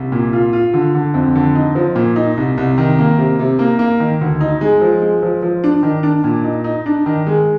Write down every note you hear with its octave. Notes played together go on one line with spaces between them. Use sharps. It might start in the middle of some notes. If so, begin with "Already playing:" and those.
Already playing: C2
A#2
F4
F4
D3
D3
F2
D3
D#4
F3
A#2
D#4
C2
C2
D#3
A#3
C3
C3
A#3
A#3
D#3
D2
D#4
G#3
F3
G#3
F3
F3
D4
D#3
D4
A#2
D#4
D#4
D4
D#3
G#3